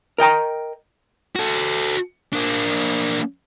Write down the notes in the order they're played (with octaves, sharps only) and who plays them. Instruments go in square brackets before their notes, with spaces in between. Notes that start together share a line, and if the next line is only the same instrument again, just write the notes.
[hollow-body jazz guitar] A#4 D#5 G5 A#5
[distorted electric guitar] F#4 A4
A#3 D4